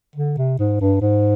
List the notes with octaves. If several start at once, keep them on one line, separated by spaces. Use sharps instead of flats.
D3
C3
G#2
G2
G#2